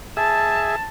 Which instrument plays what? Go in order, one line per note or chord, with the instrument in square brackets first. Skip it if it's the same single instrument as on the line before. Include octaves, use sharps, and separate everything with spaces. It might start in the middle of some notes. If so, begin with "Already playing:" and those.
[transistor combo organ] G#4 E5 [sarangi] A5